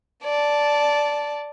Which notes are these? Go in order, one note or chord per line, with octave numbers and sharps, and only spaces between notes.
D5 A5